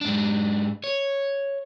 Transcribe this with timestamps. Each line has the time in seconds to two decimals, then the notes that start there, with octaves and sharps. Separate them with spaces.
0.01 G#2 D4
0.84 C#5